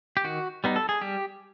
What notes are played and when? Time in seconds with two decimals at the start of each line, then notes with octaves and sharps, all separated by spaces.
0.17 G4
0.24 D#3 F#4
0.64 G3 B3 D#4
0.76 A4
0.89 G#4
1.01 G3 G4